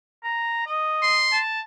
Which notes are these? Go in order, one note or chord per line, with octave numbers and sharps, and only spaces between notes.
A#5
D#5
C6
A5